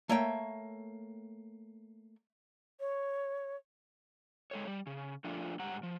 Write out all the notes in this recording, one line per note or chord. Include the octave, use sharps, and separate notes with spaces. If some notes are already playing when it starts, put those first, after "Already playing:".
A3 A#3 C#5 E5 G5
C#5
G#3 A4 C#5
G3
C#3
F3 A3 D4 F4
G#2 G3 F#5 A#5
F3